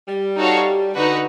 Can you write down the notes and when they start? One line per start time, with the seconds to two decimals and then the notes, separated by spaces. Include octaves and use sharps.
0.08 G3
0.36 D#4 F#4 A4 C#5 F5
0.94 D3 D#4 F#4 B4